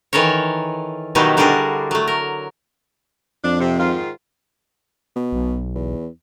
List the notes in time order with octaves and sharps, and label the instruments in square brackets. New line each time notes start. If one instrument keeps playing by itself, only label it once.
[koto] D#3 E3 A4 A#4 C#5
B2 D#3 F#3 G3 D#4 E4
D3 G3 D4 F#4 G#4 A#4
F#3 A3
A#4
[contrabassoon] F2 [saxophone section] D4
[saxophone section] C3
G#2 D#3 F4
[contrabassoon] B2
[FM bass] B1
[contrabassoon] E2